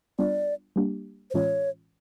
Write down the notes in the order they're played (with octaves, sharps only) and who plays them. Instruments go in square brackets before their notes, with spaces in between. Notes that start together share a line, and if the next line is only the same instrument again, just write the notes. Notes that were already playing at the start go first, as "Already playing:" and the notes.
[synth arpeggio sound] G3 B3 D4 F4 [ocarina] D5
[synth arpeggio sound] G3 A#3 D4 G4
[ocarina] C5
[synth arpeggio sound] A2 E3 G#3 C#4 F4 [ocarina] C#5